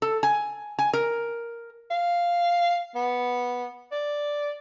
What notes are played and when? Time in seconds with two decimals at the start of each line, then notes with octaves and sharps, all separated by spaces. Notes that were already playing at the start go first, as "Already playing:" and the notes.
0.02 A4
0.23 G#5
0.79 G#5
0.93 A#4
1.91 F5
2.95 B3
3.92 D5